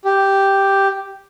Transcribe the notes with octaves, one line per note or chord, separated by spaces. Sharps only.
G4